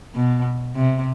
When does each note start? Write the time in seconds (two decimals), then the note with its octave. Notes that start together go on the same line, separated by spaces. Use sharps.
0.15 B2
0.75 C3